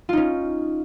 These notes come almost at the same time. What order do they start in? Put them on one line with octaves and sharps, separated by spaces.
F4 D#4 C#4